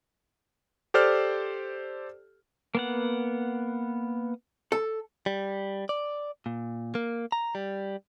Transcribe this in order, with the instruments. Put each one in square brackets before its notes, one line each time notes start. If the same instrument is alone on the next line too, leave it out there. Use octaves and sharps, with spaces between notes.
[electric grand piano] G4 A4 C5 D5 F6
[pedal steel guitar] A#3 B3 F#5
[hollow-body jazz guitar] A4
[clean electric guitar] G3
D5
A#2
A#3
A#5
G3